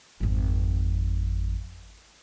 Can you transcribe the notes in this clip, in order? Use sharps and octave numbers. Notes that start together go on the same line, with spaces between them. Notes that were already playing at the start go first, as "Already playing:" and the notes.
G#1 F2